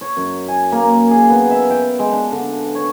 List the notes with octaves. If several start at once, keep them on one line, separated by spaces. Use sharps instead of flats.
C#5
F#2
G#5
A#3
G#4
B3
E5
G5
G#3
D4
D3
C#5